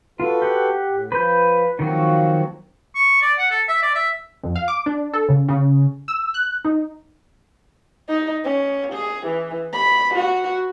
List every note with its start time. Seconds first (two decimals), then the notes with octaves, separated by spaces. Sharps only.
0.20 F4 F#4 A4 B4
0.42 G4 F#5
0.88 A2
1.12 F3 B4 G6
1.79 D#3 F3 F#3 A#3 C4 F#4
2.95 C#6
3.21 D5
3.38 F#5
3.50 A4
3.68 E5
3.82 D5
3.95 E5
4.43 F2
4.56 F5
4.68 D6
4.86 D4
5.13 A4
5.29 C#3
5.48 C#3
6.08 E6
6.34 F#6
6.65 D#4
8.09 D#4
8.44 C#4
8.93 G#4
9.26 E3
9.73 B5
10.15 F#4